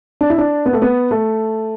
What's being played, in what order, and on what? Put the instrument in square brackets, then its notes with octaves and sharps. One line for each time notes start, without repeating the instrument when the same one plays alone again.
[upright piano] D4
E4
D4
B3
A3
B3
A3